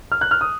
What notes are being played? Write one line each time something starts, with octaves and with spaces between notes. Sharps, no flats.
F6
F#6
F6
D#6